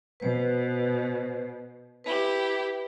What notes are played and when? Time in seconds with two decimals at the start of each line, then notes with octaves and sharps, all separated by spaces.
0.20 B2 B4 C5
2.04 E4 G4 B4